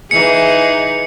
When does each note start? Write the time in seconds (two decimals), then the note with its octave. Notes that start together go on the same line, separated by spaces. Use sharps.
0.11 E3 D#4 G#4 C#7